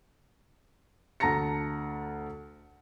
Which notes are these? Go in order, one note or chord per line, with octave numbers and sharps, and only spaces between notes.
D2 A5 A#5 A#6 C#7